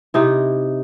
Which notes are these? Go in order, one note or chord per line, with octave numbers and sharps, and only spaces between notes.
C3 D#4 E4